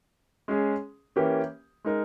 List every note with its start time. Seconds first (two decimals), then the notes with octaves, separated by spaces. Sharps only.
0.48 G#3 C#4 G#4
1.16 E3 A#3 C#4 G4
1.85 G#3 D#4 A#4